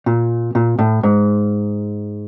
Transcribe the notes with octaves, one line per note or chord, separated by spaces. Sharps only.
A#2
A#2
A2
G#2